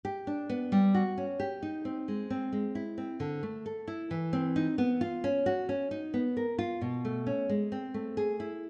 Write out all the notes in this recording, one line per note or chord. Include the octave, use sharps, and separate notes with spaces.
G4
D4
B3
G3
F#4
C#4
G4
D#4
C4
G#3
C4
G#3
E4
C4
D3
A3
A4
E4
E3
C4
D#4
B3
F4
C#4
F#4
C#4
D#4
B3
A#4
F4
B2
A3
C#4
G#3
C4
A3
G#4
E4